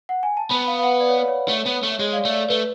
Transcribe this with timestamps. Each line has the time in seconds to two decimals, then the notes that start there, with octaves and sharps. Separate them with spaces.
0.09 F#5
0.23 G#5
0.37 A5
0.50 B3 B5
0.67 F5
0.79 F5
0.83 F#5
1.00 D5
1.09 C#5
1.19 B4
1.28 C#5
1.49 A3
1.66 B3
1.83 A3
1.99 G#3 C#5
2.13 F5
2.16 D5
2.25 A3
2.34 D5
2.49 A3 B4